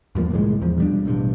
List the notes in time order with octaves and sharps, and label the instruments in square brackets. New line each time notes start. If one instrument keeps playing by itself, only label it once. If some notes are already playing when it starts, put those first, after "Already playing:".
[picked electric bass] E2 G2 F3 A#3
G1 C2 A2 G#3
E2 F3
B2 G3 D4
A1 G2 B2